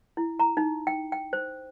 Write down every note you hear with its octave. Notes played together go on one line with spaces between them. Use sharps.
E4
A#5
D#4
G5
G5
C5